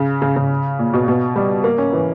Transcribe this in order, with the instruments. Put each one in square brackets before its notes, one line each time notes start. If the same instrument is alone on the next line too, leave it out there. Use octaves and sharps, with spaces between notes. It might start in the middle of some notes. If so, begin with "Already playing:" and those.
Already playing: [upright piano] C#3
C#3
C#3
A#2
B2
B2
G3
A#3
C#4
E3